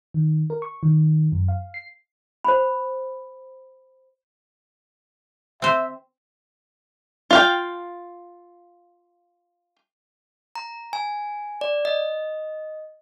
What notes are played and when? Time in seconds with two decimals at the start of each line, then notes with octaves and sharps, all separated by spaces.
0.14 D#3
0.50 A#4
0.62 C#6
0.83 D#3
1.32 F#2
1.48 F5
1.74 C7
2.44 C5 B5
5.62 C4 C5 E5
7.31 F4 F5 G5
10.55 A#5
10.93 G#5
11.61 D5
11.85 D#5